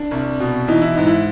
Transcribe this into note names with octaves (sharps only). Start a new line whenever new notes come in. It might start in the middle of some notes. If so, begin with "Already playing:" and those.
Already playing: D4
C2
B2
E3 D#4
E4
G#2 D#4
E4